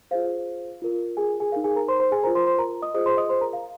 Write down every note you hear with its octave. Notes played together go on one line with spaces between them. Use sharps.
F4 G#4 C5 F5
F4 A#4
G#4 G#5
G#4 G#5
D#4 A#4 F5
G#4 G#5
A#4 A#5
C5 C6
C5 C6
G#4 G#5
F4 A#4 C5 A#5
C5 C6
C5 C6
A#4 A#5
D#5 D#6
F4 G#4 C5 D#5 D#6
C5 C6
D#5 D#6
C5 C6
A#4 A#5
F5